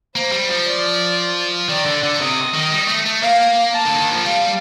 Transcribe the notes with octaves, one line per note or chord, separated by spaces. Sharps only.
A#3 C5
G3
F3
D5
D#3 D5
D3
D3
C3 D#5
D#3
G3
A3
A3
A#3 F5
A5
D3
D#3
F3
G3 F5